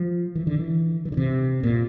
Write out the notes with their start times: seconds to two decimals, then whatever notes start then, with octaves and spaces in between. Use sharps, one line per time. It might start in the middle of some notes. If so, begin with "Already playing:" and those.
Already playing: F3
0.35 E3
0.47 D3
0.59 E3
1.05 E3
1.12 D3
1.17 C3
1.63 A#2